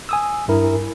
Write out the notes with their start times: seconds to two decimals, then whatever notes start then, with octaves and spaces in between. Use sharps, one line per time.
0.09 G#5 D#6 E6
0.48 G2 E4 A#4